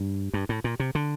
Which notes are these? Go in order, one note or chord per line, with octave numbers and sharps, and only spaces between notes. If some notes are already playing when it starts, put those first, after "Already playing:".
Already playing: G2
G2
A2
A#2
C3
D3